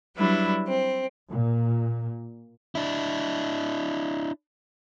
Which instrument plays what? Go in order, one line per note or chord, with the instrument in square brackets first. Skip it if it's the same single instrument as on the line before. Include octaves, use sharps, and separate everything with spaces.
[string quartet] F#3 G3 D4 E4 B4
C4
[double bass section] A#2
[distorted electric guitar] D4 E4